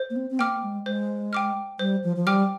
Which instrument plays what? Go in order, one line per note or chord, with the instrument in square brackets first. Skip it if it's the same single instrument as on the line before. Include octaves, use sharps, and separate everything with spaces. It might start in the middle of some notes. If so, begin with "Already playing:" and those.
Already playing: [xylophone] C5
[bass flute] A#3
C4
C4
[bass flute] A#3 [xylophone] G5 D6 F6
[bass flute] G#3
[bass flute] G#3 [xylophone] C5
[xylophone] G5 D6 F6
[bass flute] G3 [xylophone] C5
[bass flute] F3
F3
[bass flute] G3 [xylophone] G5 D6 F6